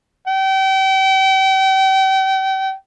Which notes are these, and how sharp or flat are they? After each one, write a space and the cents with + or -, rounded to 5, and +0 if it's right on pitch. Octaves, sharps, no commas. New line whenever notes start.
G5 -35